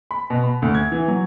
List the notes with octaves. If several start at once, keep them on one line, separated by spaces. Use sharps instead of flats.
B5
B2
B5
D2
G#6
E3
F#3